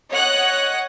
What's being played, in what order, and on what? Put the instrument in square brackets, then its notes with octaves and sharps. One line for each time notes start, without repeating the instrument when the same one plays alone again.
[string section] C#5 D#5 F#5 F#6